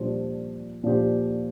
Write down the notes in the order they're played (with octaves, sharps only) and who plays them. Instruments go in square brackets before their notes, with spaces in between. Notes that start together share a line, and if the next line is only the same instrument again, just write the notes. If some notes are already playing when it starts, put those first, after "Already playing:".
Already playing: [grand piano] A#2 F3 D4 G4 C5
A#2 F3 D4 G4 C5